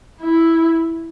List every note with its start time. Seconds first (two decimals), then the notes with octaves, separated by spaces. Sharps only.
0.22 E4